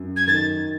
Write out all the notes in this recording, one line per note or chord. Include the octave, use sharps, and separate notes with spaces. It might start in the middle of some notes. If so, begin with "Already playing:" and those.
Already playing: F#2
G#6
D#3 A6